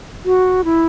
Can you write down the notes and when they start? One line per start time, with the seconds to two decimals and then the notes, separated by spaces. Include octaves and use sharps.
0.25 F#4
0.64 E4